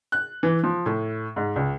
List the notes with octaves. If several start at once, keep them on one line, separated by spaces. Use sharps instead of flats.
F#6
E3
F3
A2
G#2
C#2